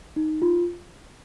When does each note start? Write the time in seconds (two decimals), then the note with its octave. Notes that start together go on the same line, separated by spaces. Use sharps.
0.16 D#4
0.42 F4